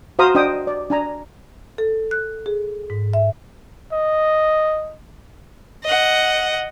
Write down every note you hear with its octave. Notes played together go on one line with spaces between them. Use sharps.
F#4 C5 F5 A#5 D#6
D4 C5 D#5 G5 D#6
D5
D4 G#5 A#5
A4
F#6
G#4
G#2
E5
D#5
D#5 F#5